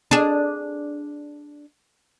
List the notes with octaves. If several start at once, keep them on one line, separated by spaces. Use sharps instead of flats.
D4 G#4